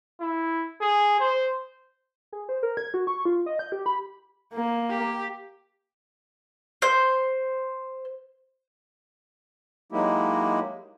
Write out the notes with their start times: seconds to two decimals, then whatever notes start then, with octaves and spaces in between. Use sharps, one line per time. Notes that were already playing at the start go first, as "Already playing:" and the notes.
0.21 E4
0.81 G#4
1.20 C5
2.32 G#4
2.49 C5
2.63 A#4
2.77 G#6
2.94 F#4
3.07 C#6
3.25 F4
3.46 D#5
3.59 G6
3.72 G4
3.86 B5
4.54 A#3
4.89 G4
6.82 C5 G6
9.92 F#3 G#3 A#3 D#4 E4 G4